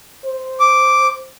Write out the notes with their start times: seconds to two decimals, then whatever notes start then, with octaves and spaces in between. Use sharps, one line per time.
0.24 C5
0.60 D6